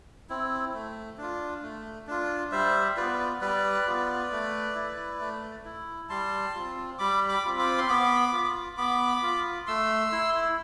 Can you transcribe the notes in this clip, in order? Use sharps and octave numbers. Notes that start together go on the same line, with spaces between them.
C4 E4
A3
D4 F4
A3
D4 F4
G3 C5 E5
B3 F4 B4 D5
G3 B4 D5
B3 F4
A3
E4
A3
E4
G3 A5 C6
C4 F4
G3 B5 D6
B5 D6
C4 F4
B5 D6
C6
B3 B5 D6
F4
B3 B5 D6
F4
A3 C6 E6
E4